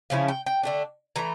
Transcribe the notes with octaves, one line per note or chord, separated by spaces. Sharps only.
C#3 F3 C#4 E4 F5
G5
G5
D3 A3 D4
E3 A3 A#5